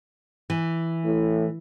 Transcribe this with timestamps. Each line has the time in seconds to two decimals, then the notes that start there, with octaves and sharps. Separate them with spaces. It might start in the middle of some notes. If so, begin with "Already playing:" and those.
0.50 E3
1.04 A2